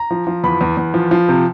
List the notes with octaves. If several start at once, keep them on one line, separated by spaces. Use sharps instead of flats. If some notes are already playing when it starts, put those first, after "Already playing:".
Already playing: A#5
F3
F3
E2 B5
E2
E2
F3
F3
C3